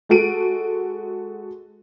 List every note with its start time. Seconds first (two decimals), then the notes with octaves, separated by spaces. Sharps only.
0.09 G#3 F#4 A4 D7 D#7